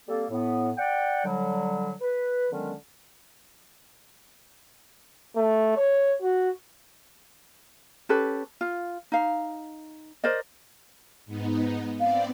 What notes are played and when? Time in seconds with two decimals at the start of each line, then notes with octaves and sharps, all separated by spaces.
0.08 G3 A#3 C4 A4
0.30 A2 B3
0.77 D5 F#5 G5
1.25 D3 F#3 G3
2.01 B4
2.52 D3 D#3 F#3 G#3 B3 C#4
5.37 A3
5.77 C#5
6.22 F#4
8.09 C#4 G4 A4 B4
8.61 F4
9.12 D#4 F5
10.24 A#4 C5 D5 D#5
11.26 G#2 B3 D#4
12.00 B3 C4 D5 F5